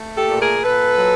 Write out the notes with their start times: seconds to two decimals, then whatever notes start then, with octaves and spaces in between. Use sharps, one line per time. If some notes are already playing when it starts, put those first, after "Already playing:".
Already playing: A3
0.16 G4 A4
0.28 A#2
0.40 G#4 A#4
0.63 A#2 A4 B4
0.99 F#3